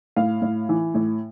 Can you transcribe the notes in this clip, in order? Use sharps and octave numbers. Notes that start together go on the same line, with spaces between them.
A2 F5
A2
E3
A2